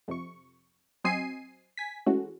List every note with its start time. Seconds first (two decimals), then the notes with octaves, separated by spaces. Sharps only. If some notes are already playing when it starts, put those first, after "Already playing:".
0.08 F2 C3 C#6
1.04 F#3 C4 D#5 G#5 C7 D#7
1.77 G#5 B6
2.06 E3 G#3 A3 C#4 F#4